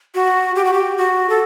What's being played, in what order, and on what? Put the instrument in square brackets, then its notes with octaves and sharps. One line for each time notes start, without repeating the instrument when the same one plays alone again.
[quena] F#4
G4
F#4
G4
F#4
A4